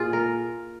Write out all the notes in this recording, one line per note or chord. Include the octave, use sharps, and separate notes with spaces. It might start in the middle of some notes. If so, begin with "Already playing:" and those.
Already playing: A#2 F4 G#4
A#4